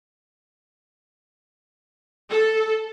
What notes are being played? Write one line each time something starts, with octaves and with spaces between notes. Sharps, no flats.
A4